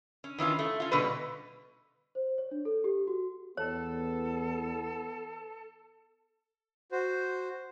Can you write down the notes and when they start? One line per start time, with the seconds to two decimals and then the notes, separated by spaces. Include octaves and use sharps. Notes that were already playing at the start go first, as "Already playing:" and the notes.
0.24 C#4
0.38 D#3 E3 C#4 F4
0.59 A3
0.80 C#4 F4
0.91 B2 D3 G3 B4
2.15 C5
2.38 C#5
2.51 D4
2.65 A4
2.84 G4
3.07 F#4
3.57 E2 B3 A4 C#5
6.92 F#4 C5